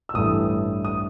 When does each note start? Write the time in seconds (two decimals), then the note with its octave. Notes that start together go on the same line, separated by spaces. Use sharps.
0.09 E6
0.14 A1 G2 E3 A3 D#6
0.84 D#6